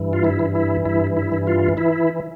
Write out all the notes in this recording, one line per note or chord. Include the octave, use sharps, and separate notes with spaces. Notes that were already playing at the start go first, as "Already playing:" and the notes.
Already playing: G2 E3
F4
E4
E3
E4
G2 E4
E4
E3
F4
E3 E4